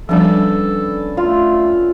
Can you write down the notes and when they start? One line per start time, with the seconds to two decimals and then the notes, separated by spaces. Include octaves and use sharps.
0.09 F3 G3 B3 C#4 D4 A4
1.17 A3 F4